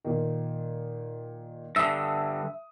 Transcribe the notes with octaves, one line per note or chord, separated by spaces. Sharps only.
A#2 D#3
G2 D3 E5 D#6